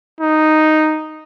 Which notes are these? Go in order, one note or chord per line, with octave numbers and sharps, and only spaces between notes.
D#4